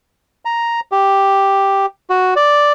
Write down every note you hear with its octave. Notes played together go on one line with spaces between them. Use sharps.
A#5
G4
F#4
D5